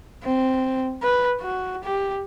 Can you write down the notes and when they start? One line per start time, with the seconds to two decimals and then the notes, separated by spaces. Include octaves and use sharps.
0.25 C4
1.03 B4
1.41 F#4
1.84 G4